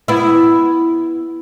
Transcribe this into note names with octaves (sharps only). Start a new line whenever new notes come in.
B3 E4